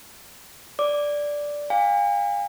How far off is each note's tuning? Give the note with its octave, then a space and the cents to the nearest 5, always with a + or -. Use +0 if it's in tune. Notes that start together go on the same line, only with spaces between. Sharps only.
D5 -5 D6 +0
F5 +30 G#5 -45